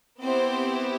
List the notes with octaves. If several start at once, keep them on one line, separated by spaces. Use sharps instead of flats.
B3 C4 E4 G4 C5